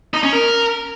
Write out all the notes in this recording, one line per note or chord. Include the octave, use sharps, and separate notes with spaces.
D#4
C#4
A#4